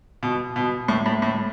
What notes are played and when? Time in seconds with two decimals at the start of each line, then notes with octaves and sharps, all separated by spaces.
0.23 B2
0.56 B2
0.88 A2
1.06 A2
1.22 A2